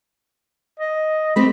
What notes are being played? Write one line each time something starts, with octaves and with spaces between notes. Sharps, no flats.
D#5
A3 C4 G4 B5